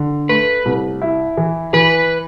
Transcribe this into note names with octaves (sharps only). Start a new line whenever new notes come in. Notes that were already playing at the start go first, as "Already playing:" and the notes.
Already playing: D3
A3 B4
C2
E4
E3
E3 B4